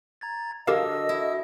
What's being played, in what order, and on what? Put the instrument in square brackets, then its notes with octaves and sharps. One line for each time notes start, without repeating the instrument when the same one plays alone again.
[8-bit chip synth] A#5 G#6 A6
[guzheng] D3 [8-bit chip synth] F#4 E6 [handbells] G4 A#4 F5 [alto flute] D#5
[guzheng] E4